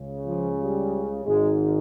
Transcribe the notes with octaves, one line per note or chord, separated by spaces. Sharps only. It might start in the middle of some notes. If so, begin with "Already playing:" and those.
Already playing: C#2 C#3
F3
G3
G#1 G#2 D#3 G#3